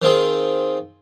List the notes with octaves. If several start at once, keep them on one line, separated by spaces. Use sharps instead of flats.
D#3 C4 F4 G#4